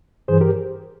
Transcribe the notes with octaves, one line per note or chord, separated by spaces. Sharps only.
G2 E3 G#4 C5
G4 A#4